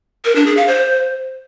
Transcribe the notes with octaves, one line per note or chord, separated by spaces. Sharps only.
A#4
D4
G#4
F5
C5